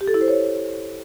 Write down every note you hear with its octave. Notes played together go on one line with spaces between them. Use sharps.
G4
A4
E4
C5
C#5